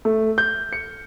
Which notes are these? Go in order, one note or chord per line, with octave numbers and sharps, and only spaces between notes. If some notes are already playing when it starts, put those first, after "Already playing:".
A3
G6
C#7